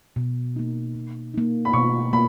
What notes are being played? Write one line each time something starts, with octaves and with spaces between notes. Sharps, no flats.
B2
A#3 D#4
B2
A#3 D#4
B5
B2 C#6
A#3 B5